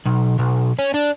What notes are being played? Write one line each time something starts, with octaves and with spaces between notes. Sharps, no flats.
B1
B1
C#4
D4